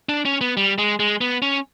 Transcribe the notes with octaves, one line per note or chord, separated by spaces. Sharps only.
D4
C#4
B3
G3
G#3
G#3
B3
C#4